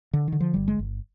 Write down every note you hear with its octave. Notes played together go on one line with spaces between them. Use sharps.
D3
D3 D#3
F3
G1 G3
G#3
G1